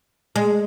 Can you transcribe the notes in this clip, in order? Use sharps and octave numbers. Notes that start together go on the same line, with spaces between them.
G#3